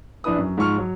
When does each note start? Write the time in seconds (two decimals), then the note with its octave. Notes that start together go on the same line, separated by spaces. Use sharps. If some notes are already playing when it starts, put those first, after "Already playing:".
0.24 A#1 D4 E4 B4 D#6
0.38 F#2
0.57 G#2 F3 C#6 F6
0.78 F#3